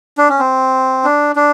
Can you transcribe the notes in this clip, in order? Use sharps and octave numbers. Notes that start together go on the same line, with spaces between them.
D4
C#4
C4
D4
D4